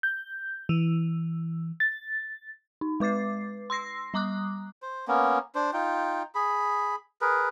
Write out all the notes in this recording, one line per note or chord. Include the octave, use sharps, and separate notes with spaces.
G6
E3
A6
D#4
G#3 B4 D6 A6 C7
C6 E6 A#6 C7
G3 A#5 D6 D#6 F#6
C5
A#3 B3 C#4
D4 C5
D#4 F4 G5
G#4 B5
G#4 A#4 B4